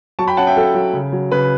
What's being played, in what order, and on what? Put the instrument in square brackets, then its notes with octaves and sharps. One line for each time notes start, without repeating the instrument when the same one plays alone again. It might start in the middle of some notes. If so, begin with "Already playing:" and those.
[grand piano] F#3 A5 C#6
G5 B5
C#4 F#5 A5
E5 G5
F#3 A4
F#3
C#3
F#3
C#3 B4